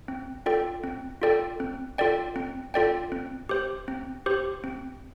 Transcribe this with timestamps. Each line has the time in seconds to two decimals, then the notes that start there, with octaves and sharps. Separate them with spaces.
0.08 C4
0.46 F4 A4 D5 G5
0.84 C4
1.22 F4 A4 D5 G5
1.60 C4
1.98 F4 A4 D5 G5
2.36 C4
2.74 F4 A4 D5 G5
3.12 C4
3.49 G4 C5
3.88 C4
4.26 G4 C5
4.64 C4